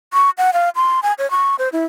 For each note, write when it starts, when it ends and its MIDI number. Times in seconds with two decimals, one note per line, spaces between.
0.13 0.30 85
0.38 0.51 78
0.53 0.70 77
0.76 1.00 84
1.03 1.13 80
1.18 1.30 73
1.31 1.56 85
1.59 1.69 72
1.72 1.85 64